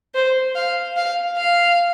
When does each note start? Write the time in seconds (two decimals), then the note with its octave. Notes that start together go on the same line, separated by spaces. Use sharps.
0.14 C5
0.55 F5
0.96 F5
1.37 F5